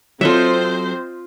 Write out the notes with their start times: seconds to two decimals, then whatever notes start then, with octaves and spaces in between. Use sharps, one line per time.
0.21 F#3 C4 F4 A4 C5 D#5 E5